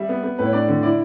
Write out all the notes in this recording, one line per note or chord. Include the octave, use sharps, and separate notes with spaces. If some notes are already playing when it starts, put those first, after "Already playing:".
Already playing: G3 E5
B3
B3
A2 B4
C#5
D4 D5
D3
E4 D5